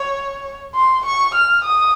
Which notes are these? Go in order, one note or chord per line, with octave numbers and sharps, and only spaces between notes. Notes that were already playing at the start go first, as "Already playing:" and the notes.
Already playing: C#5
C6
C#6
F6
D#6